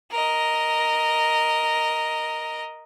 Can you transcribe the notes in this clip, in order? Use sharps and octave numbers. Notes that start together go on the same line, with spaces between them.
A#4 D#5